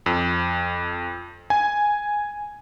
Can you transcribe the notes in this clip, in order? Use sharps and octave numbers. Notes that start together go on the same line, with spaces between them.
F2
G#5